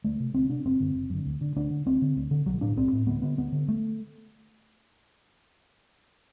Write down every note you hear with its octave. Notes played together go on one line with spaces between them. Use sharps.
D2 A3
C3
D2 C4
C3 D4
F#1 C4
F#2 D3
F#1
F#2 D3
D2
D3
D2 D4
D3
D2 C4
D3
D2
D3
B1 F#3
A2 D4
B1 C4
A2
D2 B3
D3 B3
D2 B3
D3
A3